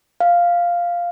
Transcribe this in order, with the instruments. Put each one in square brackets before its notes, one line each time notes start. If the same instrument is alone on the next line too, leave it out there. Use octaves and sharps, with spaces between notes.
[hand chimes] F5